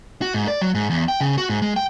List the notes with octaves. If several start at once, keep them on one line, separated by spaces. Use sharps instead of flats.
F#4
G#2
D5
F#3
G#2
E2
G5
C#3
F#4
G#2
G#3
G5